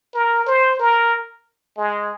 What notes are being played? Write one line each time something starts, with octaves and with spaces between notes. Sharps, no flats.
A#4
C5
A#4
G#3